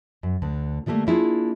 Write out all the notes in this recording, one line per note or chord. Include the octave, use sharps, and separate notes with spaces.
F#2
D2 D3
D3 F3 G3 A3 A#3
A#3 D4 E4 F4 G#4